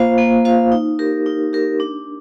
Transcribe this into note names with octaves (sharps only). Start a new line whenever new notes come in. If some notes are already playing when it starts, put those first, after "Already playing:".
Already playing: A#3 F4 C5 F5
A#3
F4 C5 F5
D#4
G4 A#4
D#4
G4 A#4
D4